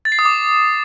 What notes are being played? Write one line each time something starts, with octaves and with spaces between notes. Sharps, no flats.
A6
C7
D#6
D6